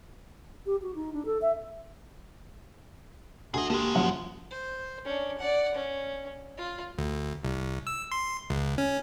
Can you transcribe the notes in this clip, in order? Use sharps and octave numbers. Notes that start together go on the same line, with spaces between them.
G4
F#4
D#4
D4
A4
E5
D2 G#4 D#5
D3 G#3 A#3 G4
F#2 F3 F#5
C5
C#4 D4
D5 F#5
C#4
F4
D2
C2
E6
C6
C#2
C#4